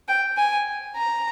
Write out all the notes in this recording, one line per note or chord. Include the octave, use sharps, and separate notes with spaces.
G5
G#5
A#5